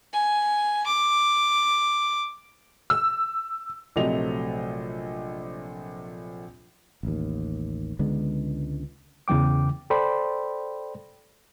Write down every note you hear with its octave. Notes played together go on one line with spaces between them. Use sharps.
G#5
D6
E6
A#1 C3 F#3 A3 D#5 F7
A1 D#2
C#2 D3 G#3 B3
E2 C#3 E3 G5 D6
A4 C5 D5 G5 B5 C6